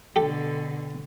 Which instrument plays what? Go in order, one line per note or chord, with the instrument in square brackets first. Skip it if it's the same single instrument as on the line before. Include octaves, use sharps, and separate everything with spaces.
[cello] B2 D3 [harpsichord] G4 A4